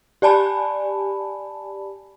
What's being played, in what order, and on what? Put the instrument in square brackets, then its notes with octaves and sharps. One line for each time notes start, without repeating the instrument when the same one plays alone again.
[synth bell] G4 D5 G#5 A5 B5